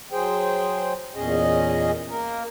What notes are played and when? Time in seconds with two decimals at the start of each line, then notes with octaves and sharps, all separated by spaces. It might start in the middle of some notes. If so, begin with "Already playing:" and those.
0.12 F#3 G#4 C5 G5
1.15 E2 A#2 C#4 G#4 D#5
2.08 A#3 A#4